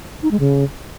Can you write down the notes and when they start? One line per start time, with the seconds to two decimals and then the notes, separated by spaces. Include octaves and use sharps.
0.23 D#4
0.31 G#3
0.40 C#3